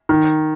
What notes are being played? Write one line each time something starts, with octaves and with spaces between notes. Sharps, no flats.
D#3